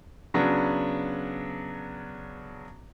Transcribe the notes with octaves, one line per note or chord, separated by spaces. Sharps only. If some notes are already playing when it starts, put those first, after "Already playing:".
C#3 F#3 B3 D4